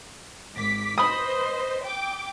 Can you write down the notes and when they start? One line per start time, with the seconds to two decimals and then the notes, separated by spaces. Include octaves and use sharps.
0.56 G#1 D6 B6
0.98 B4 C5 D#5 B5 D#6
1.84 G5 D6